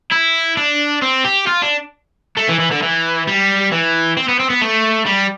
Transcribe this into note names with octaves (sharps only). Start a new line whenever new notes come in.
E4
D4
C4
G4
F4
D4
A3
E3
E3
D3
E3
G3
E3
C4
B3
C4
B3
A3
G3